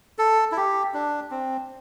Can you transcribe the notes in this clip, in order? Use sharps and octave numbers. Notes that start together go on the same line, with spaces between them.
A4
E4
G4
D4
C4